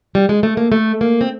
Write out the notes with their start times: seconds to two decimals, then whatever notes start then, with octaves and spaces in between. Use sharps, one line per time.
0.15 G3
0.29 G#3
0.43 A3
0.57 A#3
0.72 A3
1.01 A#3
1.21 C4